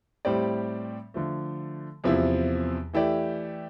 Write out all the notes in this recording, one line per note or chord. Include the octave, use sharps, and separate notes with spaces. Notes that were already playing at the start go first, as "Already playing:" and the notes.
A2 G3 C4 G4 D5
D3 F3 A3
E2 C3 F3 C4 E4
E3 A3 E4 G4 D5